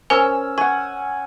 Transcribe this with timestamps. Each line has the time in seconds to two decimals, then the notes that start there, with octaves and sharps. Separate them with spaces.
0.10 C#4 A#4 C5 G#5 E6
0.58 F#5 G#5 C#6